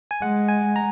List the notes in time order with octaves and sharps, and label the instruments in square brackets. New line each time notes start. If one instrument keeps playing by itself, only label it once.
[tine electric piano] G#5
[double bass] G#3 [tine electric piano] F#5
[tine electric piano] G#5
A#5